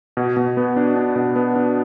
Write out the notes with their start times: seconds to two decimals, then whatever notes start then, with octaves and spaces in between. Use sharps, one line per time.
0.17 B2
0.37 B2
0.57 B3
0.77 D4
0.96 D4
1.16 B2
1.36 B3
1.55 D4